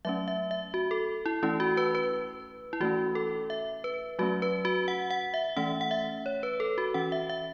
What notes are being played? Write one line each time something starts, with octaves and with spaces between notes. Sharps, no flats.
F#3 A3 C#4 E5
E5
E5
F#4
A4
E4
E3 A3 C#4 E4
F#4
B4
B4
E4
E3 A3 C#4 F#4
A4
E5
B4
F#3 A3 C#4 F#4
B4
F#4
F#5
F#5
E5
E3 A3 C#4 F#5
F#5
E5
C#5
B4
A4
F#4
E3 C#4 F#5
E5
E5